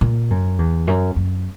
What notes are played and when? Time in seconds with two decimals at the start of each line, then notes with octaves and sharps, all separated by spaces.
0.01 A#2
0.30 F#2
0.59 E2
0.87 F#2
1.16 F#2